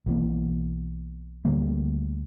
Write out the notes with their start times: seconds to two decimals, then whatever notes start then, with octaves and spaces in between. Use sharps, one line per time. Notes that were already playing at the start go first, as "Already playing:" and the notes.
0.06 B1 E3 A#3
1.45 D2 D3 G3 A#3